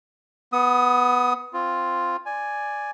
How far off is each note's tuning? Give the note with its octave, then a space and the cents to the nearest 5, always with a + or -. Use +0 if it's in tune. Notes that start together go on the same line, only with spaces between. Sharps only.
B3 +0 D#6 +20
C4 +0 F4 +0
D5 +0 G#5 +0